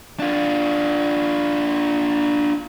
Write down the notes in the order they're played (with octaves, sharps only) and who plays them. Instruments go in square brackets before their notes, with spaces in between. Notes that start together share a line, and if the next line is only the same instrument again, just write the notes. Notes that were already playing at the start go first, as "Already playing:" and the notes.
[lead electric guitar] D4 F4